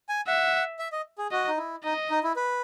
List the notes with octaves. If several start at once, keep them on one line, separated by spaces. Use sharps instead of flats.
G#5
E5 F#5
E5
D#5
G#4
F#4 D#5
D#4
E4
D#4 D#5
D#4
E4
B4